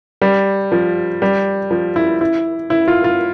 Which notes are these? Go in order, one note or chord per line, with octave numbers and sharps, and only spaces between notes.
G3
F3
G3
F3
E4
E4
E4
F4
F4